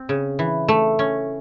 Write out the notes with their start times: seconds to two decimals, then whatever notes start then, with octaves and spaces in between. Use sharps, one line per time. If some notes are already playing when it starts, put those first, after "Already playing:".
Already playing: C4
0.09 C#3
0.39 E3
0.68 A3
0.99 C#4